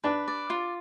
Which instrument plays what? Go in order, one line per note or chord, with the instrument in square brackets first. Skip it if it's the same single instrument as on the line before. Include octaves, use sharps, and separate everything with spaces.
[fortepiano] D4 [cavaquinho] B4
[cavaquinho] D5
F4